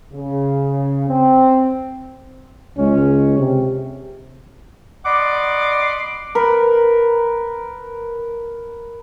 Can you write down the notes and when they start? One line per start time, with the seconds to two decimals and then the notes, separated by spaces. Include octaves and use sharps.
0.13 C#3
1.09 C4
2.77 C#2 G#3 C#4
3.38 C3
5.05 D5 D#5 F#5 B5 C6 D6
6.35 A#4 B4